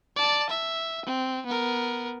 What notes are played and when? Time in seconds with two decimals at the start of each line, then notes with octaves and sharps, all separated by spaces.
0.16 D5 A5
0.49 E5
1.05 C4
1.46 B3 A#4